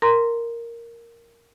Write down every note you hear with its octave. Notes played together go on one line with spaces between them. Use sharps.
A#4 A#5 C6